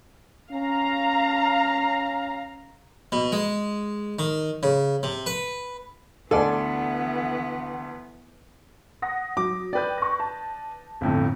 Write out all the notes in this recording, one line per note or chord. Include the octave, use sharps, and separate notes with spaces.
C#4 F5 A#5
B2
G#3
D#3
C#3
C3
B4
D2 E3 B3 A4 D5 F#5 G#5
F#5 D#6 A#6
F#3 D6
B4 D5 G5 G6
C#6 A#6
A5
G1 F2 A2